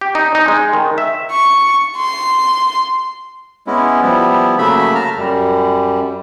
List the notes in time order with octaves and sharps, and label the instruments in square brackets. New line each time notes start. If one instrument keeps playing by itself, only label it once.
[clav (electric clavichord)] G4
D#4
D#4
G#3
D#3
E5
[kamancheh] C#6
C6
[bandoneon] G#3 B3 C#4 E4
F3 G3 B3 E4
C#3 F#3 A3 A#3 E5 B5
A5 A#5 F6
F#2 G3